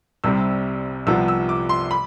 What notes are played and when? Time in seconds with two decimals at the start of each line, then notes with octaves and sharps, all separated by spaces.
0.24 C2 C3 G3 C4 E6
1.07 C2 C3 F3 B3 E6
1.28 E6
1.49 D6
1.69 C6
1.91 B5